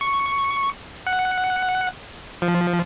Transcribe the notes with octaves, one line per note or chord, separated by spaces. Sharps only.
C#6
F#5
F3